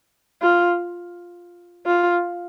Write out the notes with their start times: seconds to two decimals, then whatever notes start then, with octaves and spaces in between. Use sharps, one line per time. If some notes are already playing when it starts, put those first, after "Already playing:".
0.42 F4
1.86 F4